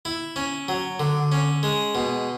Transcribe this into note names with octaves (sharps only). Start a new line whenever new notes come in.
E4
C#4
F#3
D3
C#4
G#3
B2